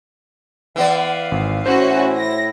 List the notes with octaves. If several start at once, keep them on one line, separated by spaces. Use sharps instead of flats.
E3 B3 D5 F5
G#1
A2 C#4 E4 F#4 C5
A#6